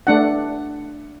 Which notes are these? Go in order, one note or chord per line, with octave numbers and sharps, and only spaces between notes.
A3 D4 F#5